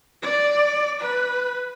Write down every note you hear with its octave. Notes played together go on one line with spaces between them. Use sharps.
D5
B4